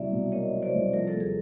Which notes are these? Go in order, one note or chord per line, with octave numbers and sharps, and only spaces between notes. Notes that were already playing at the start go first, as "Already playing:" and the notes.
Already playing: C2 F#3 D5 E5
B2
A#3 C#5 D#5
F#3
C5 D5
C2
F3 A#4
A4
D#2
G#4